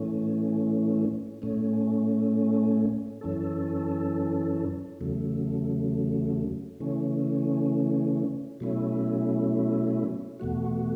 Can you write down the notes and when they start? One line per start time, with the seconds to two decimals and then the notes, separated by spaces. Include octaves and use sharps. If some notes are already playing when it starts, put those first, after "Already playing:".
Already playing: A2 E3 A3 C#4
1.42 A2 A3 C#4
3.21 F#2 E3 C#4 A4
5.01 E2 C#3 F#3 A3
6.80 C#3 E3 A3 C#4
8.60 B2 F#3 A3 C#4 E4
10.40 E2 B2 A3 F#4